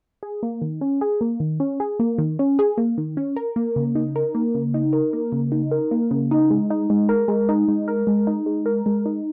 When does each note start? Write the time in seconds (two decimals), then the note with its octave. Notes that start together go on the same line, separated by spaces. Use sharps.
0.23 G#4
0.43 A#3
0.62 D#3
0.81 C#4
1.01 G#4
1.21 A#3
1.40 D#3
1.60 C#4
1.80 G#4
2.00 A#3
2.18 D#3
2.39 C#4
2.59 G#4
2.77 A#3
2.98 D#3
3.17 C#4
3.36 A#4
3.56 A#3
3.76 C#3
3.95 D#4
4.16 A#4
4.35 A#3
4.55 C#3
4.74 D#4
4.93 A#4
5.13 A#3
5.32 C#3
5.52 D#4
5.71 A#4
5.91 A#3
6.11 C#3
6.31 D#4
6.51 G#3
6.70 D#4
6.90 G#3
7.09 A#4
7.28 G#3
7.49 D#4
7.68 G#3
7.88 A#4
8.07 G#3
8.27 D#4
8.46 G#3
8.66 A#4
8.86 G#3
9.06 D#4